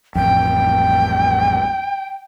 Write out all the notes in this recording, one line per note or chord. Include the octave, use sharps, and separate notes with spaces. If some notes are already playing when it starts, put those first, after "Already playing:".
A1 F2 G5